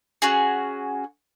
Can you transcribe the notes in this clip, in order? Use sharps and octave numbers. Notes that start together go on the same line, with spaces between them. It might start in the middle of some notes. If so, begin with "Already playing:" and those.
C#4 F#4 G#4